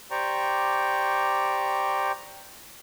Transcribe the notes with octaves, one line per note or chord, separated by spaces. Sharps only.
G4 C5 D5 G5 A#5 C#6